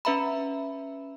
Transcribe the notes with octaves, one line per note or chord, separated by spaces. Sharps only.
C#4 B4 E5 A#5 B5